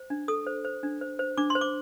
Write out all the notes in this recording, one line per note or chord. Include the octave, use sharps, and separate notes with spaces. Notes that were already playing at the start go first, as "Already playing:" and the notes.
Already playing: C5
D4
A4 D#6
C5
C5
D4
C5
C5
D4 D6
C6
C5
D6